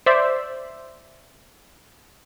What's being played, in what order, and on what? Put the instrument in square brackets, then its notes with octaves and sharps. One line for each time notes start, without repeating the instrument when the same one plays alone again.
[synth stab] C5 D5 E5